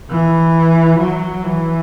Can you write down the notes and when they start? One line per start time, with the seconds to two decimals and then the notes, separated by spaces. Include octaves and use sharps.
0.10 E3
0.99 F#3
1.44 E3